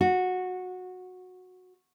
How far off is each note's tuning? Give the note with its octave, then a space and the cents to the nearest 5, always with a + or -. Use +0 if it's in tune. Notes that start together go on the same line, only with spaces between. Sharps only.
F#4 -15